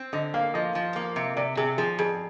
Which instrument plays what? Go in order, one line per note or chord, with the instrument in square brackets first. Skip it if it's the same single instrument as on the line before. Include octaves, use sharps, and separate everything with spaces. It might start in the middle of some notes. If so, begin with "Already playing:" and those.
Already playing: [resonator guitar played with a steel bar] C4
[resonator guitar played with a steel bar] D3 [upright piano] D#5
[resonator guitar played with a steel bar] A#3 [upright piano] F5
[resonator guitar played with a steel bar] F3 [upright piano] D#5
[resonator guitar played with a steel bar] F3
A#3
C3
[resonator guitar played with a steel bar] C3 [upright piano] D5
[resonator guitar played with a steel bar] C3 [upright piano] G#4
[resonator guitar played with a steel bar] F3 [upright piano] G#4
[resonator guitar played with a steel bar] F2 [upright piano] G#4